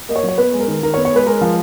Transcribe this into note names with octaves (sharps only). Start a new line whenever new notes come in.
A#3 D#5
C#5
F#3
C#5
B3 B4
G#3
A#4
D#3
D#3 A#4
C#5
B3
C#5
G#3 B4
G#3 A#4
F3